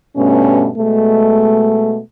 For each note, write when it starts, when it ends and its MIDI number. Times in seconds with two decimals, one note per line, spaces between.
0.16 0.69 43
0.16 0.69 47
0.16 0.69 57
0.16 0.69 61
0.77 2.00 47
0.77 2.00 56
0.77 2.00 57